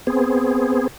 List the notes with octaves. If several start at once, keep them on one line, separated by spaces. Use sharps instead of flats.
B3 C4 G#4